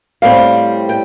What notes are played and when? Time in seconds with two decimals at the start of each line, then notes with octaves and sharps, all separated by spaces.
0.22 A2 G3 C4 F5
0.89 G5